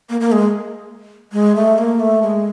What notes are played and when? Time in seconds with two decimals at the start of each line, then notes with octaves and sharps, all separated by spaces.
0.09 A#3
0.20 A#3
0.32 G#3
1.32 G#3
1.56 A3
1.78 A#3
2.00 A3
2.22 G#3